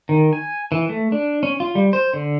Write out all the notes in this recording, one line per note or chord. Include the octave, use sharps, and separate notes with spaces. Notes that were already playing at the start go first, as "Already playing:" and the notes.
D#3
G#5
E3
A3
D4
C#4
F4
G3
C5
D3